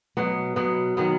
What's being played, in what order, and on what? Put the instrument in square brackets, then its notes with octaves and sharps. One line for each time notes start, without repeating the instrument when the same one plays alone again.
[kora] B2 F#3 B3
B2 F#3 B3
D#3 F#3 B3